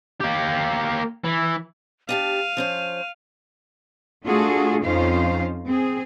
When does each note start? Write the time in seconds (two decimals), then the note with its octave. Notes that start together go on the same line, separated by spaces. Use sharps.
0.20 A#3 G4
1.24 E3
2.09 D4 G4 F5 A5 D#7
2.57 F3 C#4 C5
4.25 A3 D4 F4 F#4 G#4 A4
4.85 F2 C#4 D#4 F4 C5 F5
5.67 C4 G#4